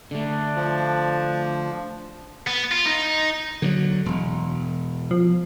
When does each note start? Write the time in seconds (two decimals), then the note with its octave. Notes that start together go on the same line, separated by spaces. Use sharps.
0.11 D3 A3 D4
0.56 F3
2.47 B3
2.71 F4
2.86 D#4
3.62 D3 D#3 F#3
4.06 E1
5.11 F3